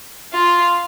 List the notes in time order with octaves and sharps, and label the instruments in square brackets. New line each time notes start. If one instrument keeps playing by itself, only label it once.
[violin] F4